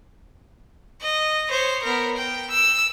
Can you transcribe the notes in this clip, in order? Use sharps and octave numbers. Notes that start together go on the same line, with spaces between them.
D#5
C5 C#5
B3 A#4
G5
E6